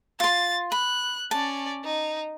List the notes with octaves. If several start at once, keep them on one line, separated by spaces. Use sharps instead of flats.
F4 C6 A6
B5 F#6
C#4 D5 A5
D#4